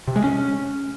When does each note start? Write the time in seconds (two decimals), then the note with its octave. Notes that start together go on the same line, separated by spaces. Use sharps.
0.08 C3
0.16 G#3
0.24 C#4